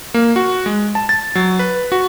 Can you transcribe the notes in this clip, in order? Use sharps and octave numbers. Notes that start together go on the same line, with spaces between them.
A#3
F#4
G#3
A5
A6
F#3
B4
F#4